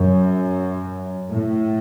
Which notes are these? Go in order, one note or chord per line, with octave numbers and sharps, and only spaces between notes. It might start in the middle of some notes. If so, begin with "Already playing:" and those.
Already playing: F#2
A2